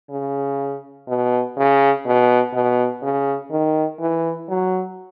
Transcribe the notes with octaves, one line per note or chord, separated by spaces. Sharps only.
C#3
B2
C#3
B2
B2
C#3
D#3
E3
F#3